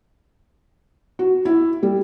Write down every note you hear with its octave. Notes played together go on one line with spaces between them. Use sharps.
F#4
E4
G3